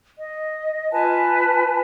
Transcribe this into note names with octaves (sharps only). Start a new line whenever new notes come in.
D#5
F4 B4 G#5 A5